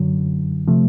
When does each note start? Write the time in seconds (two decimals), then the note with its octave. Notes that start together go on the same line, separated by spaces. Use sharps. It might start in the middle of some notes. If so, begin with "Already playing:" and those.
Already playing: F#2 D3 F#3
0.68 C3 F3 A3